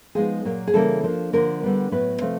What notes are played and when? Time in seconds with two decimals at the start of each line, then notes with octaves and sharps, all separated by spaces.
0.15 F3 G#3 B3 D#4 G#4
0.45 A#2 F#3 A#3
0.67 G#4
0.74 C#3 E3 G3 A#3 A4
1.04 F3 A#3 D4
1.33 D3 F3 A#3 A#4
1.63 D3 G3 B3 D4
1.91 A2 F#3 B3 B4
2.21 C3 F3 A3 C4